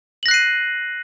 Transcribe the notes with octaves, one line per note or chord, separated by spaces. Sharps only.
F#6 A#6 C7 D#7 F#7